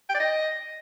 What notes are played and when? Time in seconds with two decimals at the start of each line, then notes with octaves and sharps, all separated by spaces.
0.09 G5
0.14 D5
0.20 D#5